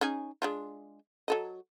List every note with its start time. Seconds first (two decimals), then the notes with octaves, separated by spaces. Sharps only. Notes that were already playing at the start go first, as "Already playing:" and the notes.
0.01 C#4 D#4 G#4
0.42 G#3 D4 F4
1.28 F#3 A4 D#5